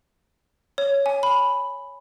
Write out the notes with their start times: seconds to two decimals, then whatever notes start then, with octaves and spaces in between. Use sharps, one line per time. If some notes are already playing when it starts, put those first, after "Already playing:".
0.78 C#5
1.06 G#5
1.23 B5